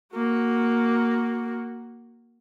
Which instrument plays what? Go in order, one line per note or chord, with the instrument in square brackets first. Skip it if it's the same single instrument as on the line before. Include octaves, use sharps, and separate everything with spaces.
[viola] A#3 F#4